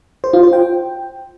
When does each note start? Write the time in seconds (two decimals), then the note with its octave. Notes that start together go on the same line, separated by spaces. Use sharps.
0.24 C5
0.33 F4
0.43 C5
0.53 G5